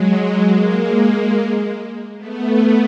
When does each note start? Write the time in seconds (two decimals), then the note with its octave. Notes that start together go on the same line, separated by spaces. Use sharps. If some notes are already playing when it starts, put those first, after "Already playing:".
Already playing: F#3 G#3
0.48 G#3 A#3
2.17 A3 B3